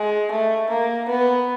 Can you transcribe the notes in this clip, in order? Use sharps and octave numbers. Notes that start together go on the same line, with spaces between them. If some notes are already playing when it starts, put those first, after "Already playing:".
Already playing: G#3
A3
A#3
B3